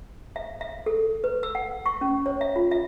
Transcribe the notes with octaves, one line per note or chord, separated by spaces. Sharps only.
E5
E5
A4
B4
E6
F#5
C#6
C#4
C#5
E5
F4
E5